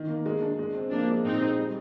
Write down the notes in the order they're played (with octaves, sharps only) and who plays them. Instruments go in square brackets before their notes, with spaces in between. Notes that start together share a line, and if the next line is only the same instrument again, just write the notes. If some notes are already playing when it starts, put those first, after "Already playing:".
Already playing: [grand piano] D#3
A#3
G#3
D4
G#3
C4
[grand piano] F3 [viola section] A#3 D4
[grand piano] G#3
[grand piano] A#2 [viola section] C4 D#4
[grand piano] G#3
G3